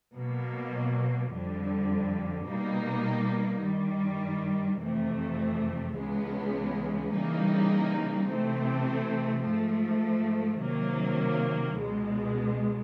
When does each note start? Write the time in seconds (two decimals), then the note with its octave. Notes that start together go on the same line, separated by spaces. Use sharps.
0.14 B2 F#3 A#3
1.31 F2 D3 G3
2.47 B2 G3 A#3 D#4
3.63 G2 D#3 G3
4.79 F2 C3 E3 A3
5.96 C#2 C#3 E3 G#3 B3
7.11 C#3 E3 G3 A#3 D#4
8.27 C3 E3 A3 C4
9.44 G#2 F3 A3
10.60 C3 D#3 F#3 A#3
11.76 C#2 B2 G#3